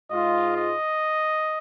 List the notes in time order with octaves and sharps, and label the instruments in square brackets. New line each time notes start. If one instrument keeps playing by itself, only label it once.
[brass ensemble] G#2 G#3 F4 [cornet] D#5
[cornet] D#5